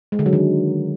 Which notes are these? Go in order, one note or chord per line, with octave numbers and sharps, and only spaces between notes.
G#3
D3
F#3
D#3